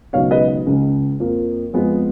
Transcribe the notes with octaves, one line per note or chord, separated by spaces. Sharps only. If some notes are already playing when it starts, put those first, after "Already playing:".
C#2 B2 F#3 B3 D#4 C#5 F5
B4 D#5
C#2 C#3 G#3
F2 F3 A#3
F2 F3 G#3 B3 F4